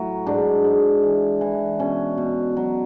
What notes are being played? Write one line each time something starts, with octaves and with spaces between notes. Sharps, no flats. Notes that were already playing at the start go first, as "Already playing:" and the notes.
Already playing: A2 F#3 E4
G#2 D4
G#2
E3
E3
B2 C#4
B2
F#3